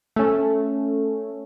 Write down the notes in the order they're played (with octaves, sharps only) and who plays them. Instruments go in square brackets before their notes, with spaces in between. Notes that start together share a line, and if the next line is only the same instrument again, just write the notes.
[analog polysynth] A3 C#4